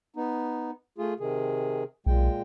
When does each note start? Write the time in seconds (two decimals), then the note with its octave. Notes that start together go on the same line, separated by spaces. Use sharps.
0.16 B3 D#4
0.98 A3 F4 G#4
1.20 C3 D#3 G#4
2.06 B1 A#2 G#3 G5